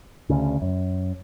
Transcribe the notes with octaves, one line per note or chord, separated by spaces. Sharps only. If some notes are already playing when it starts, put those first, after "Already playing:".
D2 C#3
F#2